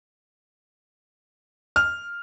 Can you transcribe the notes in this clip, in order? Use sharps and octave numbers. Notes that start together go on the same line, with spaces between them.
F6